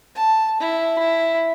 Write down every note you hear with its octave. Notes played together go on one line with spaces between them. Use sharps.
A5
E4
E4